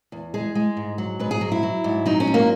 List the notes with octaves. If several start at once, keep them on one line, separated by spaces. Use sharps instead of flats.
E2
G#3 G#4
G#3
G#2
F#3
G#2 B4
G#4
F#3
E4
F#3
G#2
F#3 D#4
C#4
G#2
A#3